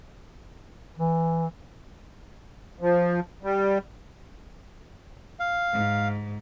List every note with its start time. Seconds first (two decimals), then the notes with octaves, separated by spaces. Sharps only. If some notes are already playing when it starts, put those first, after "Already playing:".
0.97 E3
2.81 F3
3.43 G3
5.40 F5
5.73 G#2